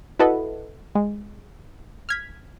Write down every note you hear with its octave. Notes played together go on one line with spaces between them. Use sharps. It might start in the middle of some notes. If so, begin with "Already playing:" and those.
E4 F#4 A4 B4 D#5 F#5
G#3
F6 G#6 B6